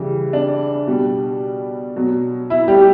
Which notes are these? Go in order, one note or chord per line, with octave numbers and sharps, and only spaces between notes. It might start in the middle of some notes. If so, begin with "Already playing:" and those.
Already playing: C#3 E3 G3
D4
B2 G3
B2 F#3
E4
G3 G4